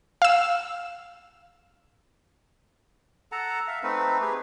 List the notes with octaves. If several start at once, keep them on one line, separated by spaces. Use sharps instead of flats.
F5 E6
A4 F#5 A5 A#5
E5 F5
A3 C4 D#4 B4
G4 G#4 B4